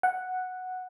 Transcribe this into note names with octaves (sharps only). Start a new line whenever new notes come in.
F#5